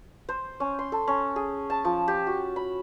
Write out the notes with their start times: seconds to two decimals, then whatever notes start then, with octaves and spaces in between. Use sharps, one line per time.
0.29 C5
0.60 C#4
0.79 C6
0.92 A4
1.08 C#4
1.36 G#4
1.70 A5
1.85 F3
2.08 G4
2.27 F#4
2.56 B5